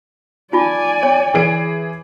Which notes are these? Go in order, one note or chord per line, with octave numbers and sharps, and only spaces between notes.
D#4 F4 D5 G#5 A5
C#5
E3 G#4 D7